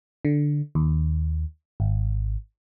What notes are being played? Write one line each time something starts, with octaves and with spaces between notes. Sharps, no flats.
D3
D#2
G#1